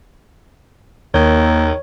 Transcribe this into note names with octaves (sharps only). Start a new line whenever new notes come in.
D#2 D#3 A#3 C#5